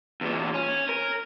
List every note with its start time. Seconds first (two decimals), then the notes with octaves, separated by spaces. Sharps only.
0.21 E2 A#2
0.54 C#4
0.89 A#4